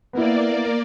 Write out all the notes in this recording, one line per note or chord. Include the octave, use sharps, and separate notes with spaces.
A#3 B3 E4 D5